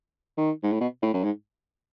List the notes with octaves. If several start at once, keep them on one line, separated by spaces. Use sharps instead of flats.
D#3
G#2
A2
B2
A2
F#2
G#2